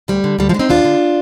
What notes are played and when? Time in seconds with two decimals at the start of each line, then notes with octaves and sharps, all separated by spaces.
0.08 D2 G3
0.24 D3
0.39 D2 G3
0.49 F3 G#3
0.54 D3
0.59 C4 D#4
0.69 D#2 D4 F4
0.85 D3